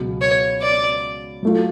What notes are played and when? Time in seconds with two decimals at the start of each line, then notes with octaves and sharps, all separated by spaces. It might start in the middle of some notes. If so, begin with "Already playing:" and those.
Already playing: C#2 B2 F#3
0.21 C#5
0.62 D5
1.43 F#3 A3 F4